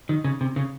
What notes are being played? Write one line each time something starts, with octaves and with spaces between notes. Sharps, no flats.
D#3
C#3
C3
C#3